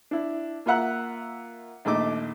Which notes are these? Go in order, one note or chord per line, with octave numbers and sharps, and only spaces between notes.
D4 E4
A#3 F4 E5 F#5 A#5 F#6
A#1 D#2 A3 D#5 D6